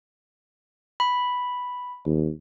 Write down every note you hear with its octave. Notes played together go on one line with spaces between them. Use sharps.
B5
D#2